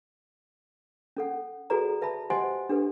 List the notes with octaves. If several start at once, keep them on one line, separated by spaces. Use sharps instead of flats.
C#4 A4 F#5
F#4 G#4 A4 B4 D5 A#5
B4 E5 A5 B5
G4 C5 D#5 F#5 G#5 C6
D4 G4 A4 B4